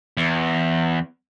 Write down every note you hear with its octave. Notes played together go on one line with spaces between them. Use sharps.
E2